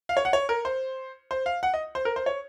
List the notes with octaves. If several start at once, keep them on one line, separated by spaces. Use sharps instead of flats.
F5
C#5
F#5
C#5
A#4
C5
C5
F5
F#5
D#5
C5
A#4
C5
C#5